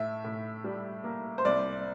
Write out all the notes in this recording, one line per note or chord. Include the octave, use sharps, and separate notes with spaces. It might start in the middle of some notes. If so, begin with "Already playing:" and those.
Already playing: A2 E5
A2
G3
A#3
C5
C2 D5